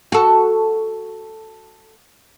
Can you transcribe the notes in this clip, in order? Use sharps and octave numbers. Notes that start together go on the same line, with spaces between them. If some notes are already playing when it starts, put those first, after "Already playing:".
F#4 A4